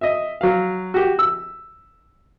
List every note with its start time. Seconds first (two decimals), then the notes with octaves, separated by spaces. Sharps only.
0.01 D#5 E5
0.41 F#3 F5
0.94 F#4 G4
1.19 E6